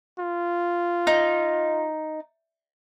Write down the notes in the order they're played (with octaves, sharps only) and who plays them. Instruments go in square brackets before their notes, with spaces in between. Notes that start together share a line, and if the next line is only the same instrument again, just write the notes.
[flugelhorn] F4
[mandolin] D#4